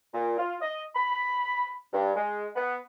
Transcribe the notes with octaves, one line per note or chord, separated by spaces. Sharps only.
A#2
F4
D#5
B5
G2
G#3
B3